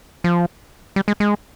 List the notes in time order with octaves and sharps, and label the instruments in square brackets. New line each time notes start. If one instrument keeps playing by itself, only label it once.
[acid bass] F3
G3
G#3
G#3